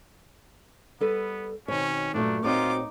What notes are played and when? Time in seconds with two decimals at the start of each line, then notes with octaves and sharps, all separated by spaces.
1.01 G3 B3 A4 B4
1.68 B2 D#3 C4 C#4 C#5
2.14 G2 A#2 F#3 A3 D4
2.44 A#2 C4 D#4 F4 F#4 C#5 D6